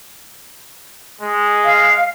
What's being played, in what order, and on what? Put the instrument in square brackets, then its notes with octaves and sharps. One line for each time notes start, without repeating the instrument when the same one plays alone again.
[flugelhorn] G#3
[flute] F5